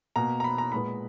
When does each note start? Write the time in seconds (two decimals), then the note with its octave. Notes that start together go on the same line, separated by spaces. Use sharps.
0.16 B2 A#3 A#5
0.40 A#5
0.44 B5
0.58 A#5
0.72 A#2 G#3 B3 B5